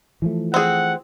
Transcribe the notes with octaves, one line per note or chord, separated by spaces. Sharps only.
E3 F3 A3
C4 G#4 F#5